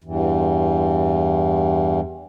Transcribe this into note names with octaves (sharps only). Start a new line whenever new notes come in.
E2 G2 E3